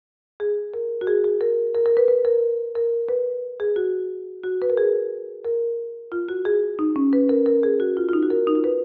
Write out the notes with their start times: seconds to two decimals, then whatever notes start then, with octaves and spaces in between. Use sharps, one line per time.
0.40 G#4
0.74 A#4
1.01 F#4
1.07 G#4
1.24 G#4
1.41 A#4
1.75 A#4
1.86 A#4
1.97 B4
2.08 B4
2.25 A#4
2.75 A#4
3.09 B4
3.60 G#4
3.76 F#4
4.44 F#4
4.62 B4
4.70 A#4
4.77 G#4
5.45 A#4
6.12 F4
6.29 F#4
6.45 G#4
6.79 D#4
6.96 C#4
7.13 B4
7.29 A#4
7.46 A#4
7.63 G#4
7.80 F#4
7.97 F4
8.09 F4
8.13 D#4
8.22 F#4
8.30 A#4
8.47 D#4
8.55 F4
8.64 B4